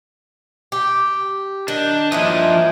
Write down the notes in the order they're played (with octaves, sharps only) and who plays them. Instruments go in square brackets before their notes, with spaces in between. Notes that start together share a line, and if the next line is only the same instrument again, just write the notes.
[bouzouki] G4
[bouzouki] D#3 [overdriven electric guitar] D4
[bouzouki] E3 A#3 D#4 [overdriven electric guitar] F3 D#5